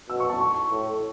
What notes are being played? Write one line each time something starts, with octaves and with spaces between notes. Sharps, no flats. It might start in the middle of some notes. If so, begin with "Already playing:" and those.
B2 E6
C#6
A5
C#6
A2